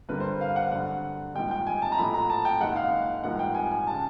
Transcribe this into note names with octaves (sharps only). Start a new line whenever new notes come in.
G2 D3 G3 A#3 B4
C5
F5
F#5
G2 D3 F#3 F#5
A#1 G#2 D#3 G3 G5
G5
G#5
A5
A#5
A#1 A2 F#3 A3 B5
A#5
A5
G5
F#1 F#2 D#3 G#3 F#5
F5
A#1 G#2 E3 G3 A#3 F#5
G5
G#5
G#5
C#3 A5